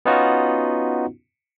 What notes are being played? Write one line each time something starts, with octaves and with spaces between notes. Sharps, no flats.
B3 C#4 D#4 F4 F#4